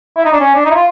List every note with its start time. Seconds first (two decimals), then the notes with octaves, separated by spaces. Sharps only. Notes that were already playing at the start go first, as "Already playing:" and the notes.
0.16 E4
0.25 D#4
0.32 D4
0.40 C#4
0.55 D4
0.65 D#4
0.71 E4
0.75 F4